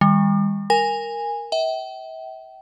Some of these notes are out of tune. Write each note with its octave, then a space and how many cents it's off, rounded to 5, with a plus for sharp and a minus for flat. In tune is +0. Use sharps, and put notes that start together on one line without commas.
D#3 +25 G3 +40
A#4 +0 G#5 -15
E5 -35 G5 -35